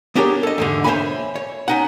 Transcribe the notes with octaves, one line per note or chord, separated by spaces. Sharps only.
B3 D4 G4 G#4 A#4 C#5
A4 D#5
E2 G#2 D3
C5 C#5 D#5 E5 G#5 B5
C#5
C#4 D#4 F#5